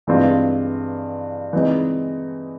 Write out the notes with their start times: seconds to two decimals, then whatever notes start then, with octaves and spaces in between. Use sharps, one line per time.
0.07 G2 E3 G#3 C4 F4
1.53 E3 G#3 C4 D#4